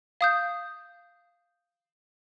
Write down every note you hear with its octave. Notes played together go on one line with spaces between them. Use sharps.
F5 D#6 G6